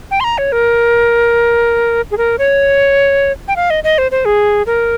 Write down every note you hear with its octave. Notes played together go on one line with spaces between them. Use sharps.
G5
C6
A#5
C#5
A#4
G#4
A#4
C#5
G5
F5
D#5
D#5
C5
C5
G#4
A#4